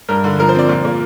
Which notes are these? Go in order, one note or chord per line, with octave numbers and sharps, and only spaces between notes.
G2 A#4
D3
F3 A#4
C5
C4 D5
A#2 D5
A#3